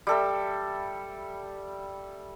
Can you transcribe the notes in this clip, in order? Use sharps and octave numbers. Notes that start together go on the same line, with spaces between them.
G3 A4 E5